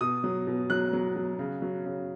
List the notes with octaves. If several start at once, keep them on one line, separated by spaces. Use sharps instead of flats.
B2 D#6
F#3
B2
F#3 F#6
F#3
F#3
C#3
F#3
C#3